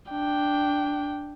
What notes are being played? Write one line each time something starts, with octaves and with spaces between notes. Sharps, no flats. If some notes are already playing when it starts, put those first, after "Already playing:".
D4 G5